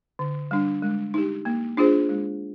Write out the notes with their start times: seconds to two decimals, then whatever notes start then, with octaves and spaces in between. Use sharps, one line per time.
0.19 D3
0.51 G3 D4
0.82 G#3
1.14 D#4 G4
1.45 A#3
1.77 D4 F4 G#4 C5
2.09 G#3